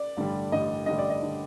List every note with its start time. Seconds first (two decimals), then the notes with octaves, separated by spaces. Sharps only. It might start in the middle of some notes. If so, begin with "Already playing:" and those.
Already playing: D5
0.17 A1 G2 D3 G3
0.52 A1 G2 D3 G3 D#5
0.86 A1 G2 D3 G3 D#5
0.98 D5
1.10 D#5
1.22 D3 G3